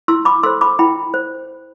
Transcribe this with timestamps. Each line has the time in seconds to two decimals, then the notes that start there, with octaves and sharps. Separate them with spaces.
0.08 E4 C6 E6
0.25 B5 D6
0.43 A4 C5 C6 E6
0.61 B5 D6
0.79 E4 G5 B5
1.14 C5